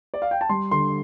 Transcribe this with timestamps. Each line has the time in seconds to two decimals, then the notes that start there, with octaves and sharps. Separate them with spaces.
0.14 D5
0.22 F5
0.31 G5
0.41 A5
0.49 G3 C6
0.71 D3 C6